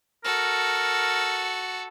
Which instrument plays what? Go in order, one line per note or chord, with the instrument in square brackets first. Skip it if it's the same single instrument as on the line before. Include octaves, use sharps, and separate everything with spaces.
[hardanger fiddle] F#4 A4 [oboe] A#4